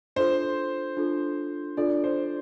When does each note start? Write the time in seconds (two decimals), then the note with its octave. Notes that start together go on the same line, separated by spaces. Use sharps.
0.16 D4 F4 A4 C5
0.97 D4 F4 A4
1.77 D4 F4 A4 D5
2.04 C5